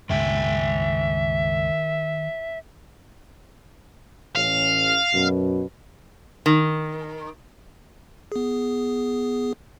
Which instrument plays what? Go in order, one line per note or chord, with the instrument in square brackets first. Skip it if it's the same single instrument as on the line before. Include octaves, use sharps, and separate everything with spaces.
[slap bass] C#2 G2 A#2 [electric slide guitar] D#3 G5 G#5 [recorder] E5
[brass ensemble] A1 C#4 [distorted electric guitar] F5
[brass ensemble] F#2 B2
[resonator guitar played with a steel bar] D#3
[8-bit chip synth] B3 G#4